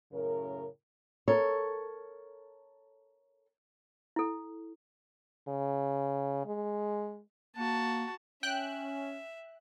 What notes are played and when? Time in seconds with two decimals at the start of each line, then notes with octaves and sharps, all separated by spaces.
0.12 F#2 A2 C#3 A#4
1.28 A4 A#4 C#5
4.16 E4 A4
5.49 C#3
6.46 G#3
7.56 A#3 F#4 A5
8.43 C#4 E5 G5 F#6